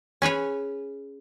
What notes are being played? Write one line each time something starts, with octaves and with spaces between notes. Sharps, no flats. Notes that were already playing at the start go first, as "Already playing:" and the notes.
C#4 G#4 B4 C#5